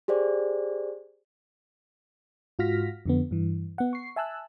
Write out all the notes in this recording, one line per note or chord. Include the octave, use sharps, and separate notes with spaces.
G4 G#4 C5 D5
G#2 F4 F#4 F6 A#6 B6
F2 D3 B3
G2 E3
B3 F#5
C#6 C7
E5 G#5 A5 E6 F#6